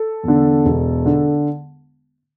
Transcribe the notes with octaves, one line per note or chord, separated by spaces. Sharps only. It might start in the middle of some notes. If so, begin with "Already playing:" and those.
Already playing: A4
E2 D3
E1
D3